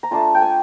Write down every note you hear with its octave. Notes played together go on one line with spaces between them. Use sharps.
A#5
A3 D4 F4 A5
G5
G#5